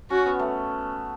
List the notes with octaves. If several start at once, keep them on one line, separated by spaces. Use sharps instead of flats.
C#4 F#4
B3
A3